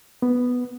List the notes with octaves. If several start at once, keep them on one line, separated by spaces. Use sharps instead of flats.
B3